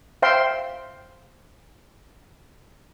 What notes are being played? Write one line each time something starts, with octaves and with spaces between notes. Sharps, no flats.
C5 E5 F5 G5 C6